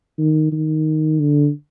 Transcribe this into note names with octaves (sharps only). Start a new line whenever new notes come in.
D#3
D#3
D3